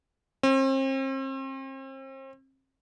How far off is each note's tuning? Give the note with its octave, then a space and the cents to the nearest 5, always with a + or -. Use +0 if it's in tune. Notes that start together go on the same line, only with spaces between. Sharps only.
C4 +40